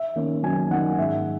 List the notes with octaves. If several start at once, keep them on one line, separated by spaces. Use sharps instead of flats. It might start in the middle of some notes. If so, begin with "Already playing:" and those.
Already playing: E5
D#3 A#3 C#4
F#2 G#5
D#3 A#3 C#4 F#5
G#2 E5